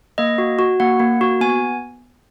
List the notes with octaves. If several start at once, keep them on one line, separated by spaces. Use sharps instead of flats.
A#3 D#5
F#4
F#4
A#3 F#5
A#3
F#4
B3 G#5